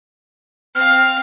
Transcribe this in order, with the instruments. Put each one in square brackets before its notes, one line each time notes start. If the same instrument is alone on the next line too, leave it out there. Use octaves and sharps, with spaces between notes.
[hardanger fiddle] C4 F5 [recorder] F6